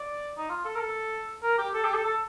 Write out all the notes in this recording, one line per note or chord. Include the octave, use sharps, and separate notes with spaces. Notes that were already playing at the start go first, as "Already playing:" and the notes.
Already playing: D5
D#4
F4
A4
A#4
A4
A#4
G4
A4
G4
A4
A4